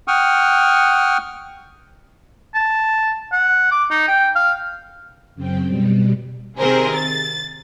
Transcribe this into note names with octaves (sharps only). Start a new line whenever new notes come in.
F#5 G5 C#6 D#6 F6
A5
F#5
D6
D#4
G5
F5
F#2 C#3 C4 G5
B2 G3
C3 D#3 C4 G#4 A#4 C5
A6